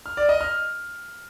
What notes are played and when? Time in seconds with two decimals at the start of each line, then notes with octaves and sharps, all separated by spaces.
0.06 F6
0.17 D5
0.29 D#5
0.41 F6